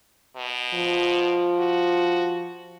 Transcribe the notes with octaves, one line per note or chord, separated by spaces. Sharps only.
B2
F3
F#4